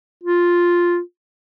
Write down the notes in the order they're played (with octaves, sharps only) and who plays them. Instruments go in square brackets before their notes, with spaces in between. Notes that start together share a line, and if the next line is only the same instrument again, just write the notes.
[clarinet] F4